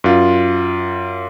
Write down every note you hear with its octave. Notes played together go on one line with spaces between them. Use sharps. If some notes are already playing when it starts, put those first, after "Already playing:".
F#2 F4